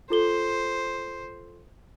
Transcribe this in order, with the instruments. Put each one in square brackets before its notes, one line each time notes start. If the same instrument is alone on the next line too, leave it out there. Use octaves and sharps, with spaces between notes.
[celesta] F4 A4 G7 [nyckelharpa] C5